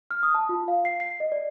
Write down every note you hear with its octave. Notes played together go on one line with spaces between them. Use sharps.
F6
D#6
A5
F4
F5
C7
C7
D#5
D5